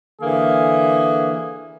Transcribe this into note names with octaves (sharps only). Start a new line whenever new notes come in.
D3 E3 A#3 G#4